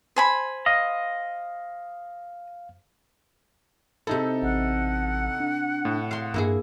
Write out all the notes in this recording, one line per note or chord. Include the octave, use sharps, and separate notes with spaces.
C5 G#5 B5
D#5 F5
C3 D#4 E4 A4
A1 F#5
D4
A2
F5 C6
G2 A#3 E4 G#4